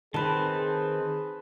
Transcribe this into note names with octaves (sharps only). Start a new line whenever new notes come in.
D#3 C4 G#4 B4 A5